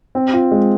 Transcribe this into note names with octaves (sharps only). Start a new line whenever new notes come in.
C4
F4
G#3